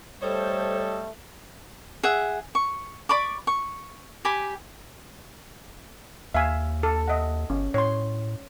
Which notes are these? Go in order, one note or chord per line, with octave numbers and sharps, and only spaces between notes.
G3 A3 A4 C5 C#5 D#5
G#4 E5 F#5
C#6
D5 B5 C#6 D6
C#6
G4 G#5 B5 D6
D#2 E5 F5 G#5
A4
D#5 E5 F#5
G1 C#4
A2 C#5 C6